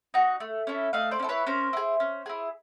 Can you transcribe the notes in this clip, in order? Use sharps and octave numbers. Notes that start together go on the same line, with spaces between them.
D#4 F#4
A3
C#4 E4 A4
A3 D#5 F5
C5 D5
C#4
E4 A4
B4 C#5
C#4 A#4 C5
E4 G#4
C#4
E4 G#4